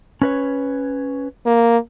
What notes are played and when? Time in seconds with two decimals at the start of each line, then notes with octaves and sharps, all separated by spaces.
0.22 C#4 B4 C#5
1.46 A#3